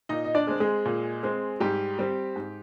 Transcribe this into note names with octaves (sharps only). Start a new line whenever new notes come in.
A#2 D#4 D#5
D#5
D4 D5
G#3 C4
G#3 G#4
A#2
G#3 C4
G#2 G3 G4
G3 C4
G#2